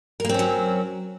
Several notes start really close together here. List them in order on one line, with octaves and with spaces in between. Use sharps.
A#4 A#3 C4 C#4 F#3